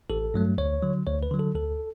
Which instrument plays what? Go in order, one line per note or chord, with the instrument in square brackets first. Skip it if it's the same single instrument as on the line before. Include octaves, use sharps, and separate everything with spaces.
[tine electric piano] A1 A4
G2 F#3 A3
D2 C#5
D3 F#3
D2 C#5
B4
D3 F#3
A4
D2 A4